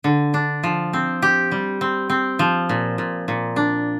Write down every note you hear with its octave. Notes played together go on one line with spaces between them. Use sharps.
D3
D4
F3
C4
G4
G3
C4
C4
F3
A#2
A#2
A#2
D4